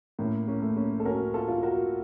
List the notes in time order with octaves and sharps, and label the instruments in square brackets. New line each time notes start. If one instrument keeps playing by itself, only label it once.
[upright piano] A2 [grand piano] A#3 C#4
[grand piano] A#3 C#4
[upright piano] A3
[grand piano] A#3 C#4
A4
[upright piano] C#4 [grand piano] F#4 A#4
[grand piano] F4 A4
[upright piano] F4
[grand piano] F#4 A#4